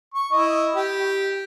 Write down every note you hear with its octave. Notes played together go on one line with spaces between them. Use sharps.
C#6
E4 D#5
G4